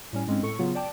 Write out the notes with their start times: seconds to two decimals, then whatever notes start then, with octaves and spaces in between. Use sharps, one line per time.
0.13 A2 G3 C#4
0.27 G#2 G#3 C4 C#4
0.42 A2 A4 C#6 C#7
0.59 C#3 F#3 B3 F4
0.75 D5 G5 A5 D6